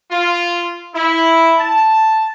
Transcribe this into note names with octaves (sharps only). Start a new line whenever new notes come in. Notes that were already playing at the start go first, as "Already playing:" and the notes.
F4
E4
A5